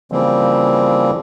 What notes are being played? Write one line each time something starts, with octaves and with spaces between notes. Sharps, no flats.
C#3 E3 F3 G3 A#3 C4